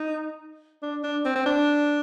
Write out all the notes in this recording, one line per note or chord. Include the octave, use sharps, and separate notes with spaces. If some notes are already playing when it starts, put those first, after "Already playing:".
Already playing: D#4
D4
D4
C4
C4
D4